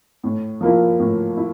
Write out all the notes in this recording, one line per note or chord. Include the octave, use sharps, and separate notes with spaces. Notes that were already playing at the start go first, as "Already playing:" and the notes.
A2
F3 A#3 E4
A2
E4